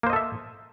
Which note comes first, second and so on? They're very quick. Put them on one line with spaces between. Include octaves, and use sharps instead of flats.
A#3 C5 D#5 A4 E5